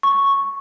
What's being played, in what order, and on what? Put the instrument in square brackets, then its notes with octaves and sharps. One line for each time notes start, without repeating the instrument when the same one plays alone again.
[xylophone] C#6